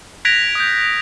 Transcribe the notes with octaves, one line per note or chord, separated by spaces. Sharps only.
F#6 G#6 A#6 B6 D7 F7
D#6 G6